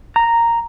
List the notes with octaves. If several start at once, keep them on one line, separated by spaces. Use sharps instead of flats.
A#5